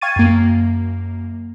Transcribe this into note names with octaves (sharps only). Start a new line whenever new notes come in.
F5 G5 C#6 G#6 A6 D#7
F#2 A#3